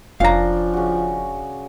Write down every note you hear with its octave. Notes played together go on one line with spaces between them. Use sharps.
F1 F3 C#4 D4 F5 A#5
C#3 F#4